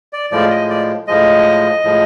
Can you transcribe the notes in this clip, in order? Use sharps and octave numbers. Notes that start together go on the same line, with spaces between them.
D5
A2 F3 G#3 D5
D#5
D5
A2 F3 G#3 D#5
A2 F3 G#3